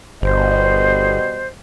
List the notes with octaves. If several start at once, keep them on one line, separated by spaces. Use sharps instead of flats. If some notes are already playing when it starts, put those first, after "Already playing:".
G1 B2 G3 C5 D#5